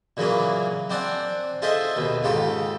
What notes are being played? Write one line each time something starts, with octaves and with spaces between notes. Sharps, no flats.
A#2 C#3 E3 F#3 A#3 C#4
C4 D4 C5 D5 F#5 G#5
F4 G#4 A4 C5 D#5 E5
D#2 B2
G#2 C#3 F4 G4 A4